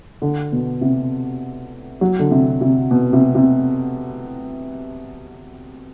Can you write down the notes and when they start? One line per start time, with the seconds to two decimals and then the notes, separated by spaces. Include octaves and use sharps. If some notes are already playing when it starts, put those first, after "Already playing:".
0.22 D3
0.52 B2
0.81 C3
2.01 F#3
2.19 D3
2.31 C3
2.61 C3
2.91 B2
3.13 C3
3.35 C3